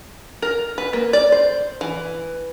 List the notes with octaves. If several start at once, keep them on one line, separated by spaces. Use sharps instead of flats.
A#4
B4
A#3
D5
C5
E3